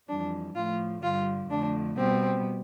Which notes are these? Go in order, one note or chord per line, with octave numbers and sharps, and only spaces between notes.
F2 E3 G3 D4
A2 F3 A3 F4
G2 D3 G3 F4
F2 D3 A3 D4
B2 G3 B3 C4